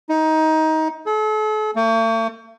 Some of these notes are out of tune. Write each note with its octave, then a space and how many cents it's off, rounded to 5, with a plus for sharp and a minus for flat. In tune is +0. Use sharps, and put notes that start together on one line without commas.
D#4 +20
A4 -40
A3 +45